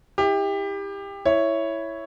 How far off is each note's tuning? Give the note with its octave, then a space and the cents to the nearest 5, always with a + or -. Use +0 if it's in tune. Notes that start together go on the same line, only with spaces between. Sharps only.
E4 -25 G4 +25
E4 +0 C#5 +0